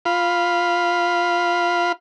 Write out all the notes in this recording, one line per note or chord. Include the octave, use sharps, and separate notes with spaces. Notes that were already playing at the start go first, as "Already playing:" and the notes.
F4 F5 B5